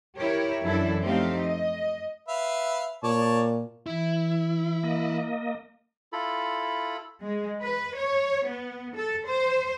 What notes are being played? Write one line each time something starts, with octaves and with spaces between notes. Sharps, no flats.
E4 G4 A#4 C#5
F#2 E3 D4 E4 A4 D5
F3 A3 C4 D#4 G4 F5
D#5
B4 E5 F5
A#2 C#5 D5 A5
E3 E4
A#3 D#5
E4 F4 A4 B5
G#3
B4
C#5
B3
A4
C5